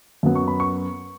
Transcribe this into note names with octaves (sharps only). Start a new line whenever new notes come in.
F#2 F#3 B3
C#6
B5
C#6